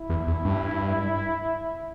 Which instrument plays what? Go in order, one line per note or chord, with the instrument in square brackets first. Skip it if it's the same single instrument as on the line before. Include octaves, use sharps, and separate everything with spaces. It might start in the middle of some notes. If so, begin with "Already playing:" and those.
Already playing: [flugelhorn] E4
[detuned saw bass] E2
E2
G2